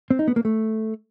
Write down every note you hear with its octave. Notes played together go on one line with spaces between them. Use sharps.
C4
D#4
B3
A#3
A3